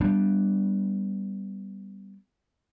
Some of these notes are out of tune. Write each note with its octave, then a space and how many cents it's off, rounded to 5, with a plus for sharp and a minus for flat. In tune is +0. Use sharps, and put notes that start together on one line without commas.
G3 +0 B3 +0 D4 +0